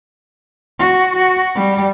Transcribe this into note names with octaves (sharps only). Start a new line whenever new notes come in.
F#4
F#4
G3